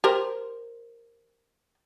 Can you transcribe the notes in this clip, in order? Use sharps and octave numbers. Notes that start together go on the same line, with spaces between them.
G4 A#4 C5